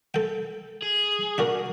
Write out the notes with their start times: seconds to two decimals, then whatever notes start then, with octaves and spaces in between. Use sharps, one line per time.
0.14 A4 G5
0.82 G#4
1.38 D4 F#4 A#4